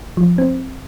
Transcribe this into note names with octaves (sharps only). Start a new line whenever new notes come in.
F3
C4